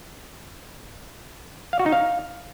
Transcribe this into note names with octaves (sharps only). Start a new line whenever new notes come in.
F5
F#4
D#4
F5